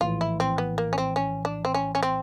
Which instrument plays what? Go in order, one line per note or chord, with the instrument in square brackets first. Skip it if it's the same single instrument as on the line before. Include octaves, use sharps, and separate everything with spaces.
[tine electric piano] A#1 A2 E3 [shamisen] F4
[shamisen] E4
C4
B3
A#3
C#4
C4
C#4
D4
C4
C#4
C#4
C4